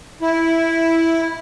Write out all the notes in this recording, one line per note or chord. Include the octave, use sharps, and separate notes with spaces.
E4